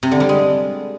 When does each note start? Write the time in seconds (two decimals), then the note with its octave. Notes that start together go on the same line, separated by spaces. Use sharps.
0.03 C3
0.11 D3
0.20 G3
0.29 G#3